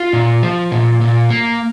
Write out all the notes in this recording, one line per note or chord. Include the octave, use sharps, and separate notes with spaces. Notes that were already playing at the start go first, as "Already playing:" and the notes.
Already playing: F4
A#2
F3
A#2
A#2
A#3